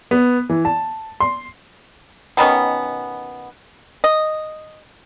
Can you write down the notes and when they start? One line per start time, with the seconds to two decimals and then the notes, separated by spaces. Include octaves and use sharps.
0.11 B3
0.49 E3
0.65 A5
1.20 C6
2.37 B2 D#3 B3 C#4
4.04 D#5